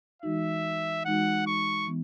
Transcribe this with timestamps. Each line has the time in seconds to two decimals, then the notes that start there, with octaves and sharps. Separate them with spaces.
0.22 E3 G#3 D#4 F#4 E5
1.05 E3 G#3 D#4 F#4 F#5
1.47 C#6
1.87 E3 B3